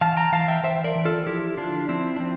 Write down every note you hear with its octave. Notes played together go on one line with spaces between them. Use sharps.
E3 F5 A5
G5 A#5
E3 F5 A5
E5 G5
E3 C5 E5
A#4 D5
E3
F4 A4
F3 E4 G4
D3 D4 F4
F3 C4 E4
D4
F3 C4